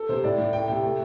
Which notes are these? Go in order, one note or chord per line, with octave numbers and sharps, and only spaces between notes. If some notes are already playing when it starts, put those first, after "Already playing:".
Already playing: A4
C3 C5
A2 D5
A2
A3 G5
C3 G5
A3